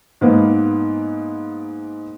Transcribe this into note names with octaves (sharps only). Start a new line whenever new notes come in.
G#2 A#3 B3